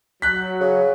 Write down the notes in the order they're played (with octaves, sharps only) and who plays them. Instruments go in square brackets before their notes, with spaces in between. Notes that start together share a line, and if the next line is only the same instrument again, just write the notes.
[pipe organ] F#3 [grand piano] F#6 B6
[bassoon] C#3